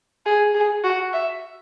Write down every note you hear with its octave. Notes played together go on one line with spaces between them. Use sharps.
G#4
G#4
F#4
E5